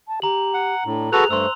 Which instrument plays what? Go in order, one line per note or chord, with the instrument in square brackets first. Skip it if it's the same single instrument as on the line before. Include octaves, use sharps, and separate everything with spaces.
[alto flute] A5
[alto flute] G4 [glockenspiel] A#5 F#7
[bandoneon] F#5
[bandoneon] A2 [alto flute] D4
[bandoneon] F#4 A4 B4 [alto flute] G#4 [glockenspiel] F#6 F7
[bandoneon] G2 A3 [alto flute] C5 [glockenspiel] C6 E6